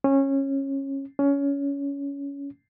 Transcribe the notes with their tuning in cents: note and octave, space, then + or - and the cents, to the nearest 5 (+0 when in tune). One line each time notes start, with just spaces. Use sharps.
C#4 -20
C#4 +20